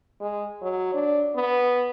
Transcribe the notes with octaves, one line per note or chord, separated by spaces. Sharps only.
G#3
F#3
D4
B3